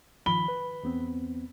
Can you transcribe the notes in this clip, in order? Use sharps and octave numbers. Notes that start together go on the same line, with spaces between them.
D#3 F3 B5 G7
B4
E2 B3 C4